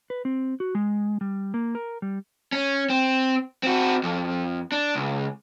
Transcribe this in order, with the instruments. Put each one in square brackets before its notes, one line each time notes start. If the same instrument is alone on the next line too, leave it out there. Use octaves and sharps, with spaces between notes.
[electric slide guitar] B4
C4
F#4
G#3
G3
A#3
A#4
G3
[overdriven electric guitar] C#4
C4
C4 F#4
F2
D4
C#2